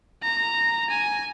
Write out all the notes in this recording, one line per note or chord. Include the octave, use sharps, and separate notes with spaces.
A#5
G#5